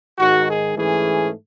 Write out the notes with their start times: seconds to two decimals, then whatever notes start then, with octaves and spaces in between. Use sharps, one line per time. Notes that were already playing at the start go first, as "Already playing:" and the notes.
0.18 G#2 D#3 G#3 F#4
0.47 G#4
0.76 G#2 E3 A3 C#4 G#4